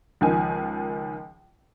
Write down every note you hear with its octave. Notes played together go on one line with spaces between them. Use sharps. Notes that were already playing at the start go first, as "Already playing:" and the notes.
C#2 D#3 F3 G#5